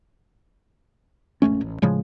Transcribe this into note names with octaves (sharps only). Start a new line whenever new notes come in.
E1 A1 A3 C#4
A1
A2 C#3 F3 G#3